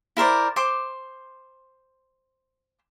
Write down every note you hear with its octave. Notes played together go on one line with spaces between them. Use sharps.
E4 A#4 C5 D5
C5 C6 D6